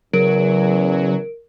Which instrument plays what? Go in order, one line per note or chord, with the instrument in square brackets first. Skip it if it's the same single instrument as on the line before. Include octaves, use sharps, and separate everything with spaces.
[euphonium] E2 [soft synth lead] C#3 [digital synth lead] F#3 [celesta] A#4 D7